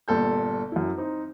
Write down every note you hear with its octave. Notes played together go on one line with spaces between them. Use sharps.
G1 A#2 A4 G6
F#2 E4
C4 D#4